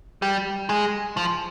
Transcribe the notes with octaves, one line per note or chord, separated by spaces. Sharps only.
G3
G#3
F3